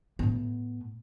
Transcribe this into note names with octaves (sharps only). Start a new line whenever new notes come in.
A2 B3